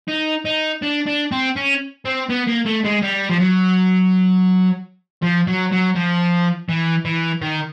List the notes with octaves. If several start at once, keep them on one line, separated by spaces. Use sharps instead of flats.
D#4
D#4
D4
D4
C4
C#4
C4
B3
A#3
A3
G#3
G3
F3
F#3
F3
F#3
F#3
F3
E3
E3
D#3